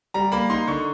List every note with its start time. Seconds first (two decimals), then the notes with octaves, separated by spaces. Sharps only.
0.14 G3 A#5
0.32 A#3 B5
0.50 D#4 C6
0.67 D3 C#6